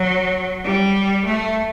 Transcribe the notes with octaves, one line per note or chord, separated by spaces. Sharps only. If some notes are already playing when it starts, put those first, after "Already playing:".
Already playing: F#3
G3
A3